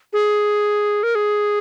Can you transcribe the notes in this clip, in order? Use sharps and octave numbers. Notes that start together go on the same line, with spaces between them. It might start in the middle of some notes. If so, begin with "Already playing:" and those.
G#4
A#4
G#4